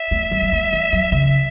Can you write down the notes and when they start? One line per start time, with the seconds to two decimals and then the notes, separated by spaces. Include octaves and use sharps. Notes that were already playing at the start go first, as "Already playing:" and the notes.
Already playing: E5
0.11 A3
0.31 F#3
0.42 F#3
0.52 A3
0.73 E3
0.93 F#3
1.12 C#3 E5